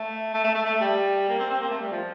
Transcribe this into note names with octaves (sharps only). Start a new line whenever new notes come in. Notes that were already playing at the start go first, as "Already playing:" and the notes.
Already playing: A3
A3
A3
A3
A3
G3
A#3
C4
C4
A#3
A3
G3
F3